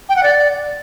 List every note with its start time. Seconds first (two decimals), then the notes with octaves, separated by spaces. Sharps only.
0.09 G5
0.16 F#5
0.23 D5